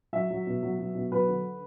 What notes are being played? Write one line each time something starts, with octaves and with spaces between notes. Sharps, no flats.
F#3 E5
F#3
B2
F#3
F#3
B2
F#3 B4
D3